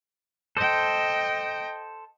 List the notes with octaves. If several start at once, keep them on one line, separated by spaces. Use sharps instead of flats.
A4 C5 D#5 G5